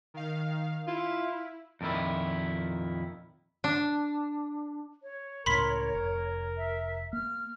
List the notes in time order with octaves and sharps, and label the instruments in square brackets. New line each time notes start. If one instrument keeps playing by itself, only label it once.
[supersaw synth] D#3 F5
[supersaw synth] E4 [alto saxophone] F4
[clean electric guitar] F2 A#2 D#3 E4
[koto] D4
[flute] C#5
[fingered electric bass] C#2 A2 C#3 [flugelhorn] A#4 [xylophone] B5 C6 B6
[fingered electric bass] F1
[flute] E5
[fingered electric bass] A#3 [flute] F6